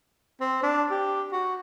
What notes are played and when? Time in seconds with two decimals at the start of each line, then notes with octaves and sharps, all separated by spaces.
0.41 C4
0.63 D4
0.91 G4
1.32 F#4